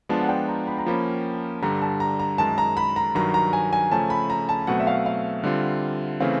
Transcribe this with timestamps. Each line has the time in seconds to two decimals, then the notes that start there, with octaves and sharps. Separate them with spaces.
0.09 F3 G#3 B3 D4 F4 A5
0.22 F#5
0.29 G5
0.48 A#5
0.67 B5
0.78 A#5
0.86 F3 A#3 C#4 B5
1.62 G2 D3 G3 A#5
1.82 A5
2.00 A#5
2.19 A#5
2.38 F#2 D#3 G#3 A5
2.58 A#5
2.77 B5
2.96 A#5
3.15 G2 D#3 F#3 A#5
3.34 A#5
3.53 G#5
3.73 G#5
3.91 C#3 F3 A3 C#4 A5
4.10 B5
4.30 A#5
4.49 A5
4.67 B2 F#3 A3 C4 F#5
4.79 E5
4.87 F5
5.06 F5
5.43 D3 G3 C4 F4
6.20 C#3 E3 A3 C4 F5